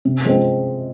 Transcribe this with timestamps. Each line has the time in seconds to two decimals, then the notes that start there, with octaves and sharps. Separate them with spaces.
0.05 C3
0.25 F3 G#3 C4